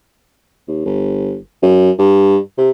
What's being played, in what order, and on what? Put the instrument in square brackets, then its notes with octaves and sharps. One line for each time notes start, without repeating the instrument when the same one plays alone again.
[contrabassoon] D#2
G1
F#2
G2
C3